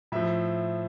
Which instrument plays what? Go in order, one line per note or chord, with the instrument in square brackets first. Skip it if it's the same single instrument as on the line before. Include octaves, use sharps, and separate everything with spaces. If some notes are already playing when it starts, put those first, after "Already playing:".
[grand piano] A2 F3 E5